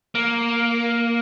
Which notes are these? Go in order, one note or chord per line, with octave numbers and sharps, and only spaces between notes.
A#3